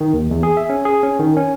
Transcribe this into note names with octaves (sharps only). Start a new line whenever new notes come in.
D#3
D#2
E2
G#4
E5
C#4
G#4
C#4
D#3
C#4